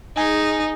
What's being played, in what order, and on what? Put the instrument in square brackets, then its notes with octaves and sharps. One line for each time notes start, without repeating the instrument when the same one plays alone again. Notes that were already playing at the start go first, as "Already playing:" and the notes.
[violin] D#4 [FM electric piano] G#4